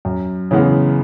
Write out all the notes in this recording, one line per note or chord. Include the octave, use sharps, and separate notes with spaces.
F#2
C#3 E3 G#3 B3